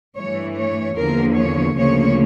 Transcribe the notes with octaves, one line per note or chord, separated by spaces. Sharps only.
G2 E3 A3 C#5
C#5
E2 D3 F3 A#3 A#4
C#5
D2 C#3 F3 A#3 C#5